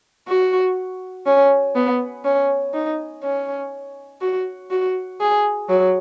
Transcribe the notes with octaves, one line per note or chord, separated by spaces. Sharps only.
F#4
C#4
B3
C#4
D#4
C#4
F#4
F#4
G#4
F#3